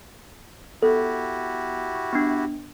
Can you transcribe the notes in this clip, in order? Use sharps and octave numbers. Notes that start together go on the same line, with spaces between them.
B3 E4 F#4 G4 A4
C#6
B3 D4